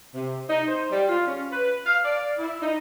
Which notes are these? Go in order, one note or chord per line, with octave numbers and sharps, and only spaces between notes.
C3
D#4
C5
G3
F4
C#4
B4
F5
D5
E4
D#4